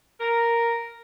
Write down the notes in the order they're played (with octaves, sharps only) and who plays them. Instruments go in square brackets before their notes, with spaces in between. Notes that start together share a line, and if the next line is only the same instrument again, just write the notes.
[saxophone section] A#4